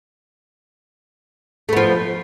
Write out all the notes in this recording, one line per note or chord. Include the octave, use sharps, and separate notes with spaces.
F3 A3 B3